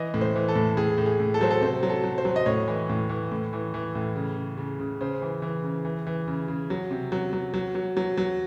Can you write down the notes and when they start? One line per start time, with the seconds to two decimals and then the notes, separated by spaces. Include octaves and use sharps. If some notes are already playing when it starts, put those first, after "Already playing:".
Already playing: E3 D#5
0.14 A2
0.21 C5
0.36 E3
0.48 A4
0.56 A2
0.77 A2 G#4
0.98 A2
1.06 G#4
1.20 A2
1.34 A4
1.41 F#3 C5
1.51 A4
1.61 C3 C5
1.83 F#3
1.90 A4
2.04 F#3
2.18 C5
2.25 F#3
2.36 D#5
2.46 A2 C#5
2.68 E3
2.89 A2
3.09 E3
3.32 A2
3.53 E3
3.74 E3
3.95 A2
4.16 C#3
4.37 C#3
4.57 C#3
4.80 C#3
5.01 C#3 C5
5.22 E3
5.42 E3
5.64 C#3
5.85 E3
6.07 E3
6.28 C#3
6.48 C#3
6.70 F#3
6.91 C3
7.12 F#3
7.33 F#3
7.54 F#3
7.75 F#3
7.97 F#3
8.18 F#3